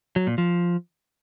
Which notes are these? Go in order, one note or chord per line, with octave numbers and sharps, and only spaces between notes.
F#3
A#2
F3